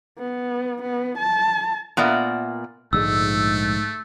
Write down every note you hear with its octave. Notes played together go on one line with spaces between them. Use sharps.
B3
B3
A5
A#2 B3 A#4 D5 E5
A#1 G#2 D3 G#3 A3 E6